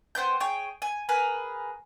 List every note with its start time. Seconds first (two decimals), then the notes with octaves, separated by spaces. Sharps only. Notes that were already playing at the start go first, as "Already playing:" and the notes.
0.15 B3 C5 G5 G6
0.40 G#4 C#5 G5
0.82 G#5
1.09 G#4 A#4 B4